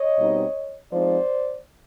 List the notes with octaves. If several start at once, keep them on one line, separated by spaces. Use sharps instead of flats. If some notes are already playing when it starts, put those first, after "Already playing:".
Already playing: C#5 D#5
B2 G3 C4 D#4
F3 G#3 C4 D#4 C5 D5